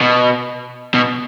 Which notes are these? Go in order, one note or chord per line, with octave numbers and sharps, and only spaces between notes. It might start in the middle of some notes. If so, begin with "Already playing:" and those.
B2
B2